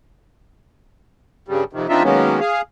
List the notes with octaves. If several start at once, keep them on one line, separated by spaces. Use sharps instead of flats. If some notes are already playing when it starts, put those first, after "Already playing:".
G2 C#3 G3
F2 C3 D#3
E2 C4 D4 D#4 F4 E5
D#3 F#3 G#3 A#3 B3 C#4
G#4 F5